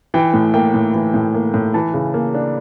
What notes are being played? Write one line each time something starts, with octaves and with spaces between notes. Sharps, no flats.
E3 G5
A2
A#3 G5
A2
E3
A2
A#3
A2
E3 A5
C#3
A#3
D4